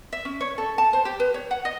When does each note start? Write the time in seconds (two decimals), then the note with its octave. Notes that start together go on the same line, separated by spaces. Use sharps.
0.13 E5
0.25 C#4
0.41 C#5
0.58 A4
0.78 A5
0.93 C5
1.05 G4
1.20 B4
1.34 C#5
1.51 F#5
1.65 D#5